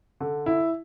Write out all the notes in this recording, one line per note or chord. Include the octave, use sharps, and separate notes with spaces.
D3
E4